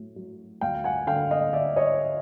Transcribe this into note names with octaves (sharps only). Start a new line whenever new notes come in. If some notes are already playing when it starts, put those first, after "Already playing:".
Already playing: A2 F#3
F#3
D2 F5 G5
F#5 G#5
D3 F5 G5
D#5 F5
D3 D5 E5
C#5 D#5